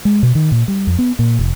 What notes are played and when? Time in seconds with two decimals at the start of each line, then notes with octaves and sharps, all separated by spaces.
0.05 G#3
0.23 B2
0.35 D#3
0.52 A#2
0.68 G3
0.87 F2
0.99 B3
1.19 A#2
1.39 F1